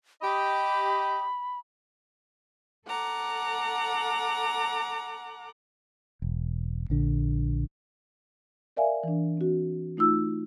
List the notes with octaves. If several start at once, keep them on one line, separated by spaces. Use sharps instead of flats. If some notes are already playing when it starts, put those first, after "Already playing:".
G4 D#5 B5
A4 F#5 A#5 D6
E1
A#1 D3
A#4 D5 E5 F5 G#5
E3 D4
C4 F#4
A3 D#4 F4 E6